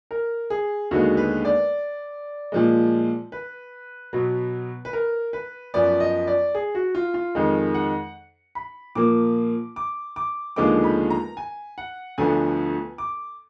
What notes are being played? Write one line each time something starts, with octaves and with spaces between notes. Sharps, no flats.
A#4
G#4
D#2 D3 G#3 B3 F#4
B4
D5
A#2 F3 G#3
B4
B2 F#3 B3
B4
A#4
B4
F#2 F3 B3 D5
D#5
D5
G#4
F#4
F4
F4
F2 D#3 G#3
F#5
B5
A#2 F3 A#3 D6
D6
D6
D#2 D3 F3 G#3 B3 D6
B5
A#5
G#5
F#5
D2 D3 F3 B3 G#5
D6